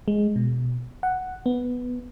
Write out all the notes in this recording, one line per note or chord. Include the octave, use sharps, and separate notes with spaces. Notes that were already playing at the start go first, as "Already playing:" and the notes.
G#3
B2
F#5
B3